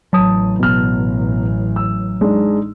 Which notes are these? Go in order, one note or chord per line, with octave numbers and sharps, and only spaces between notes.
A1 F#3 A5 D#6
B2 F6
E6
G#3 D4 D#4